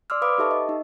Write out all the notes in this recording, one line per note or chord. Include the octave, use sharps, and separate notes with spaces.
D5 C6 D6 E6 F6
B4 C5 F5 B5 D6 D#6
D#4 G4 A4 E5 A5 C#6
D#5
D#4